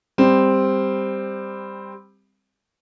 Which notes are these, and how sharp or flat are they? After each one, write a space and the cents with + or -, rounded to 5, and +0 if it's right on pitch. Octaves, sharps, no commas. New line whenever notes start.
G3 +15 C4 +0